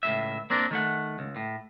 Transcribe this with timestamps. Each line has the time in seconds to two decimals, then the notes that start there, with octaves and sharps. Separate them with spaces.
0.03 C#2 A2 E5
0.50 A#3 C4 D4 A#4
0.71 D#3 A3 F#5
1.19 C#2
1.36 A2